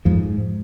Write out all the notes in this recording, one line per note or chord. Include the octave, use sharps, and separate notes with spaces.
F2 G#2 F3